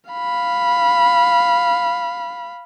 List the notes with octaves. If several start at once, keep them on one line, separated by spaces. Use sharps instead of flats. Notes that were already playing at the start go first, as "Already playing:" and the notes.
F5 B5